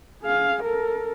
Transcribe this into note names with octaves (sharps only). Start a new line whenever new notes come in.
G#4 F5
A4 A#4